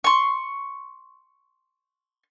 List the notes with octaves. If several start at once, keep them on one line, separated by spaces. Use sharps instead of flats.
C6 C#6